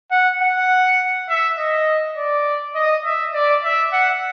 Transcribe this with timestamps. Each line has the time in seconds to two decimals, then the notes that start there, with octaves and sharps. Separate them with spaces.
0.11 F#5
0.41 F#5
1.29 E5
1.58 D#5
2.17 D5
2.75 D#5
3.05 E5
3.34 D5
3.64 E5
3.93 F#5